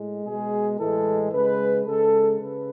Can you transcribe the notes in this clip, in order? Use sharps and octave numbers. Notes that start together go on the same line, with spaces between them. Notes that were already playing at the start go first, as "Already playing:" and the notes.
Already playing: A2 G#3
B2 G#3 G#4
A2 E3 G#3 A4
C#3 G#3 B4
C#3 G#3 A4
C#3 B4